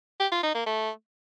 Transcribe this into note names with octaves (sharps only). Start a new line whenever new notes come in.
G4
F4
D#4
A#3
A3